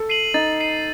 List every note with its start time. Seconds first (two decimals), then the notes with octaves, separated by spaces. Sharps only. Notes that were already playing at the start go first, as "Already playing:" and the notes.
Already playing: A4
0.09 C7 D#7 F#7
0.34 D#4 A6
0.60 C7 D#7 F#7